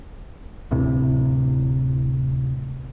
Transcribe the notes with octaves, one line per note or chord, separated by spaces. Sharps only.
D1 A2 C3